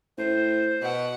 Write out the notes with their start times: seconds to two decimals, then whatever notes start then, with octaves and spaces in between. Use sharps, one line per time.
0.18 A2 C5
0.82 B2 F#5